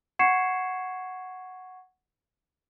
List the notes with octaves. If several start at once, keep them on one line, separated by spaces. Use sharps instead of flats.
F#5 C#6 G#6 C7 C#7 E7